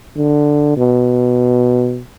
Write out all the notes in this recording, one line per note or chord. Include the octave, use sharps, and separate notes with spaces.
D3
B2